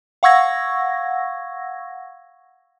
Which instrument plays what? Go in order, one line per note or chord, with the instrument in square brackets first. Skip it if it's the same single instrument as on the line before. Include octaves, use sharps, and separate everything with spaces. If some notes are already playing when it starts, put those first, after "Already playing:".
[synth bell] F5 F#5 C#6 E6 G#6 A#6